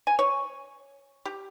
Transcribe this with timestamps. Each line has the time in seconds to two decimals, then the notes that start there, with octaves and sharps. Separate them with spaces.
0.07 G#5
0.19 C#5
1.25 G4